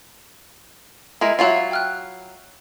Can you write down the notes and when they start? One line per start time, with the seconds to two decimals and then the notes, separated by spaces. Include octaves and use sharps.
1.21 G#3 E4 A#4
1.39 F#3 E4 F4 E5 F5
1.71 G5 F6 F#6